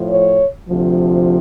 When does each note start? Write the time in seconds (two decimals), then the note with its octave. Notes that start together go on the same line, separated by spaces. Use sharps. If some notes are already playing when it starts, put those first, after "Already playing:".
Already playing: A2 F3
0.10 C#5
0.68 D2 C3 F3